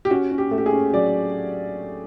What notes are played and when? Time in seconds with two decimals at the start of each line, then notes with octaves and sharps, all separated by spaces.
0.05 G4
0.10 C#4 F#4
0.32 C#4
0.38 G4
0.51 A3
0.58 G4
0.66 G#4
0.73 C#4
0.93 F#3 D5